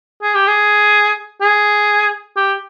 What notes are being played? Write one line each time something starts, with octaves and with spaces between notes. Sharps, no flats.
G#4
G4
G#4
G#4
G4